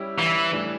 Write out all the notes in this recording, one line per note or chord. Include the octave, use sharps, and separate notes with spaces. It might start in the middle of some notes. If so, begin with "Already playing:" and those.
Already playing: G3 C#4 E4 G4
E3
A2 E3 G3 D4